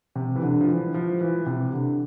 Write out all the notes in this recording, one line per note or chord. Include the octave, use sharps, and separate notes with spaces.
C3
E3
D3
F3
E3
F3
E3
C3
D3